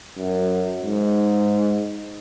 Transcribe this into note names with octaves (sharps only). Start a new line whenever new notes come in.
F#2
G#2